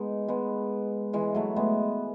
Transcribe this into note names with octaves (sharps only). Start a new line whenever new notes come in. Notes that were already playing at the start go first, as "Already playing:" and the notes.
Already playing: G#3 B3 D#4
G#3 B3
E3 G#3
F#3 A3
G#3 B3